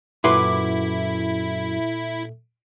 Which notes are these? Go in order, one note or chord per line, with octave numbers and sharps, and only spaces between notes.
F#2 A#2 E4 A4 B4 E5 C6 D6